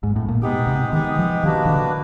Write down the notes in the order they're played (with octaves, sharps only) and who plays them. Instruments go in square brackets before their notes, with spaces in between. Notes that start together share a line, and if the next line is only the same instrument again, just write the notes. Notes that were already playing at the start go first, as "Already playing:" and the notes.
[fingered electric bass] G#2
A2
A#2
[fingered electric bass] B2 [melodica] G#3 B3 D#4 G4
[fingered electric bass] C3
[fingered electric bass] D#3 [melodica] G#3 B3 D#4 G4
[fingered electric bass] F3
[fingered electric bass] D#3 [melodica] A#3 D4 F#4 B4
[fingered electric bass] D#3
D3